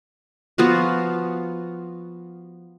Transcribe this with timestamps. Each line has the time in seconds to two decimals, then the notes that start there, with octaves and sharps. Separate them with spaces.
0.58 F3 B3 F4 F#4